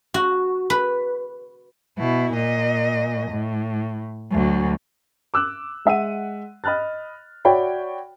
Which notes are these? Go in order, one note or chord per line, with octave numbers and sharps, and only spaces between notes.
F#4
B4
B2 E4
A#2 D#5
A2
D2 F#3
D6 E6 F#6
G#3 E5 F#5 D#7
D#5 B5 F6 F#6 A6
F#4 C#5 D5 E5 G5 B5